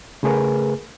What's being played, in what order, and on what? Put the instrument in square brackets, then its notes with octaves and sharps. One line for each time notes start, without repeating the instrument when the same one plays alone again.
[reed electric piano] C#3 A3 G#4 A#4 B4